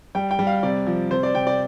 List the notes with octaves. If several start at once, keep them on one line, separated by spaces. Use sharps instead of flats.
G3 G5
G5
G3
F5
C3 D5
F3
C3 C5
D5
C3 G5
D5